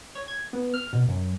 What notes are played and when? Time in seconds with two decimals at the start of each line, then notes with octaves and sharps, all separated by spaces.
0.15 C#5
0.28 G#6
0.53 B3
0.74 F6
0.93 B2
1.08 F#2